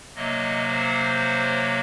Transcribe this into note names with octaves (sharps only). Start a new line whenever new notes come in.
C3 F#3 A#3 D#5
C5